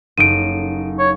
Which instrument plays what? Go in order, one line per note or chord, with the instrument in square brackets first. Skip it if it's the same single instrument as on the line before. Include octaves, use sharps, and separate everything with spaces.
[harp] F#1 D#4 A4 [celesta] D7 D#7
[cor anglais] C#5